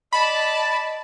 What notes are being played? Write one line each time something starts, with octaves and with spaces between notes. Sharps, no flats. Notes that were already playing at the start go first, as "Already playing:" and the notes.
D5 D#5 A5 B5